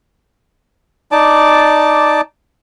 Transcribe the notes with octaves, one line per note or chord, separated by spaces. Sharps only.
D#4 D5 A5 D6